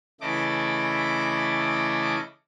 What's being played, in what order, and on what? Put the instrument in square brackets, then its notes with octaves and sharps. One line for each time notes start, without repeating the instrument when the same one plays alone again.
[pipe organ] C#3 E3 A3 E4 D#5 D6